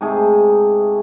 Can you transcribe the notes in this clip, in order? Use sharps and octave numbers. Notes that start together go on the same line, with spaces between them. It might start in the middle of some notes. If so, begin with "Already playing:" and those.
G#2 C3 A3 G#4